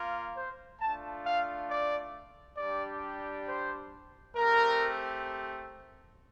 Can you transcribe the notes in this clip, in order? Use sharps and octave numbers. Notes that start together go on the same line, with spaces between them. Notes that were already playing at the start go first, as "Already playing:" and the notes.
Already playing: A#3 F4
C5
A3 D4 F4 A5
F5
D5
G3 D4 G4 D5
C5
A3 C4 G4 A#4